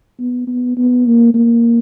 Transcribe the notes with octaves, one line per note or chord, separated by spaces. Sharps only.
B3
B3
B3
A#3
A#3